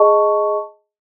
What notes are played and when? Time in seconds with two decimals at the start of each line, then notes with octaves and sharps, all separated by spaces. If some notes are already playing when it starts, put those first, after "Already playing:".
Already playing: G#4 D#5 A5 C#6